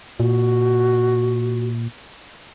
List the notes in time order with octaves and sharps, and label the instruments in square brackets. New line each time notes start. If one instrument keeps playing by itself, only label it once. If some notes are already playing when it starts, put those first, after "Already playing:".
[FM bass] A#2 [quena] F#4